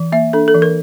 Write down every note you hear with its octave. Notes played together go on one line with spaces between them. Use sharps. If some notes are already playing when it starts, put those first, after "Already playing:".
Already playing: E3
A#3 E5
D4 A4
A4
E3
A#4